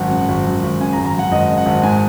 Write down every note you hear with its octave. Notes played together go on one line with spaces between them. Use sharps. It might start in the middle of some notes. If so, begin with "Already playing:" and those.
Already playing: G#1 F#2 F#5
C#3
G#1
F#2
G#1
C#3 G#5
A#5
G#1
A#5
F#2 F#5
G#1 D#5
C#3
F#5
G#1
G#2 G#5